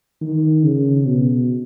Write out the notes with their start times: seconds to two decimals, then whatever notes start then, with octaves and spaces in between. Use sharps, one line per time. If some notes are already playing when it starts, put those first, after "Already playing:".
0.22 D#3
0.64 C#3
1.07 B2